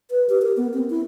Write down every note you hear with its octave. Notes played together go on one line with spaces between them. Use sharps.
B4
G4
A#4
B3
C4
E4